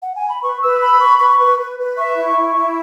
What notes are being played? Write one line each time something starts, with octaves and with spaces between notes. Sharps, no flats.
F#5
G#5
B5
B4 C#6
B4 E6
B5 E6
B4 C#6
B4 C#6
B4
B4
B4
E5 C#6
E4
E4
E4